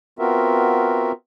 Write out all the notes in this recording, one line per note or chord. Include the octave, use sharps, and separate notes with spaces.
B3 C4 F4 F#4 A#4 E5